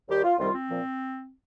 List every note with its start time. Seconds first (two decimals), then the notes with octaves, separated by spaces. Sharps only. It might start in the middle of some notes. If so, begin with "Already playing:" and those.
0.09 D#2 D#3 G3 G4
0.24 F4
0.38 C2 C3 D#3 G3 F4
0.53 C4
0.69 A#2 F3